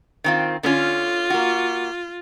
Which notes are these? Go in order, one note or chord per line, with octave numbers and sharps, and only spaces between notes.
D#3 C4 F4
D3 C#4 F4
A#3 F#4